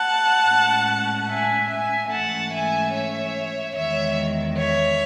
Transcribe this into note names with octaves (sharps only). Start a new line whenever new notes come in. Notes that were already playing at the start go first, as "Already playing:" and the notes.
Already playing: F#5 A5
A2 G#3 C#4
E5 G#5
E5 G#5
G#2 E3 A3 C#4 F#5 A5
E5 G#5
C#5 E5
E2 D#3 G#3 C#5 E5
C#5 E5